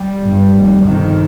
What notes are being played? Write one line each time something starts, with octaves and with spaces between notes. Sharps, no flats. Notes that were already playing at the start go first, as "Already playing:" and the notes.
Already playing: G3
G1 G2
F1 D#2
G1 F2 C3 D#3